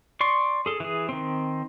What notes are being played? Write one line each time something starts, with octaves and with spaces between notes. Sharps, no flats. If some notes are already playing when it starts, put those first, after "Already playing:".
D5 C6 C#6
G#4 A4
E3 G#4
D#3 C4